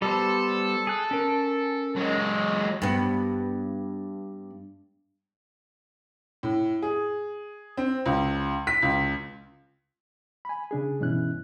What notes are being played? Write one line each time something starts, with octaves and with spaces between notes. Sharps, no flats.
G3 B3 A4 C5
G#4 F#6
C#4 A#4
F#3 G#3
G2 B3
A2
G#4
C4
C#2
B6
C#2
G#5 B5
C#3 D4 G#4
G2 B2 E3 C#4 E4 F#6